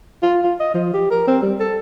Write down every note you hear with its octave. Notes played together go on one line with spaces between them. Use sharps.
F4
F4
D#5
F3
G4
A#4
C4
G3
A4